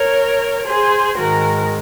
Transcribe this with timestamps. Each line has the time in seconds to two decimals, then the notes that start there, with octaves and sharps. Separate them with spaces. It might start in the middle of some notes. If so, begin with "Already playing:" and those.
Already playing: A#4 C#5
0.67 G#4 C5
1.17 G#2 D#3 G#3 F#4 A#4